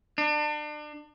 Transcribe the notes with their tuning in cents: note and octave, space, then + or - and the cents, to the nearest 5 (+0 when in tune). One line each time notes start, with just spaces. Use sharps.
D4 +35